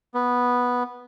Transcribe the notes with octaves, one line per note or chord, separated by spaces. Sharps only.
B3